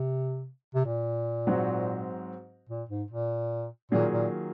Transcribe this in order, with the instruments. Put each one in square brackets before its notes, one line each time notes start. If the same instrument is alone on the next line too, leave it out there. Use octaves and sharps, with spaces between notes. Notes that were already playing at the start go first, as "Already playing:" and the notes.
Already playing: [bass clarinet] C3
C3
A#2
[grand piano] G#2 F#3 C4 D#4 F#4
[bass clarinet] A#2
G#2
A#2
[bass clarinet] A#2 [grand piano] D#3 F#3 A#3 F4 G#4
[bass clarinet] A#2